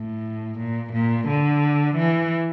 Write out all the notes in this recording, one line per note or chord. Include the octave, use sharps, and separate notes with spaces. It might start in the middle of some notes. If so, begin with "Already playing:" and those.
Already playing: A2
A#2
A#2
D3
E3